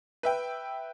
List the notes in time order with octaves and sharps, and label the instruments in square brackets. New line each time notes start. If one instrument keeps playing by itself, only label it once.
[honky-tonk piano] B4 E5 G5